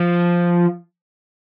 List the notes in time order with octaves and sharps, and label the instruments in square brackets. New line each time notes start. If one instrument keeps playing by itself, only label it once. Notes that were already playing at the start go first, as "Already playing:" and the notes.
Already playing: [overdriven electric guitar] F3